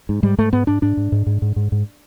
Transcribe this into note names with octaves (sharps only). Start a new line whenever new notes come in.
G#2
G#2 G3
G#2 A3
G#2 B3
G#2 D4
G#2 D4
G#2
G#2
G#2
G#2
G#2
G#2